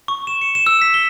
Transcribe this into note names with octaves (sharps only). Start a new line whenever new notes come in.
C#6
E7
C#7
E7
E6
B6
G7